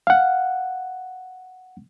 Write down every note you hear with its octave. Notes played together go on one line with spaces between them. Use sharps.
F5 F#5